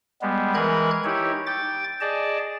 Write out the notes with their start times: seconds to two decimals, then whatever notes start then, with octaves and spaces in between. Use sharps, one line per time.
0.22 G3 G#3 B3
0.54 E3 G#3 A#4 B4 F#6 G#6
1.04 D#4 E4 G4 C#5
1.46 G5 D6 A6
2.01 G#4 D5 D#5 A5